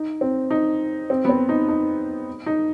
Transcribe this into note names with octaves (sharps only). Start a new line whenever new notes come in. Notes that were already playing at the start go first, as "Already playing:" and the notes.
Already playing: D#4
C4
D#4
C4
B3
C4
D#4
D#4
D#4